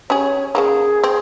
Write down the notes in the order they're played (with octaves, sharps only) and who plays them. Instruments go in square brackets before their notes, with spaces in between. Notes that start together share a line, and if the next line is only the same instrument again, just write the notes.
[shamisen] C#4 G4 G#4 [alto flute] C#5
[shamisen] C#3 F3 A#3 [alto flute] G#4
[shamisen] C4